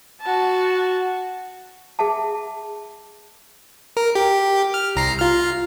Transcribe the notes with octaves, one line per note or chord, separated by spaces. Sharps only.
F#4 A5
G#4 E5 F#5 A5
A#4
G4
F6
C2 A#5 C7
F4 F6